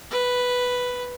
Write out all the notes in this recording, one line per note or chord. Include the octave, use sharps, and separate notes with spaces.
B4